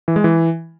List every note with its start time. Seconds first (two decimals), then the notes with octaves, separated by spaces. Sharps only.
0.08 E3
0.16 G#3
0.24 E3